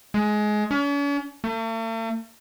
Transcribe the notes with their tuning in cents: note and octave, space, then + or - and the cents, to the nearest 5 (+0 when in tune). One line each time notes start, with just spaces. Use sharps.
G#3 +20
C#4 +45
A3 +45